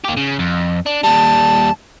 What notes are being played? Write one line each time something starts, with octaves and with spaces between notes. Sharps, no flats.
A#3 G4
C#3
F2
D4
D#2 G3 A5